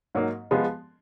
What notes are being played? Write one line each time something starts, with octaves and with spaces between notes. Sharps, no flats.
G#2 F#3 A#3
F3 G#3 B3